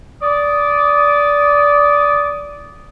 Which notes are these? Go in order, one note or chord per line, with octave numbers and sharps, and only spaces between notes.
D5 D6 D#6